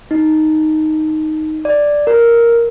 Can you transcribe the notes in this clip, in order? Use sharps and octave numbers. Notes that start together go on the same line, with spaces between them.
D#4
D5
A#4